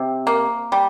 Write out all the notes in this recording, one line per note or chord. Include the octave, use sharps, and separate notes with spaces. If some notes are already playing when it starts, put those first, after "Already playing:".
Already playing: C3
A#3
G3